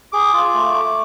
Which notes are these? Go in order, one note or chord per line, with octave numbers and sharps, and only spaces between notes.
G#4 D6
F4
A3
A3